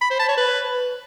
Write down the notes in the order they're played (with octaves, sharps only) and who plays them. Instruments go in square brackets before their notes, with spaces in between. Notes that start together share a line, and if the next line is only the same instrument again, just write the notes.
[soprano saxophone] B5
C5
A5
C#5
B4